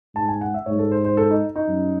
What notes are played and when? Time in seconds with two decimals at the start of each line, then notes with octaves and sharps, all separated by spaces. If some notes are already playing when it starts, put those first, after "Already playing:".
0.15 G#2 A5
0.28 G#5
0.41 F#5
0.54 E5
0.66 G#2 C#5
0.79 A4
0.92 C5
1.05 C5
1.17 A4
1.30 D#4
1.56 D#4
1.69 F#2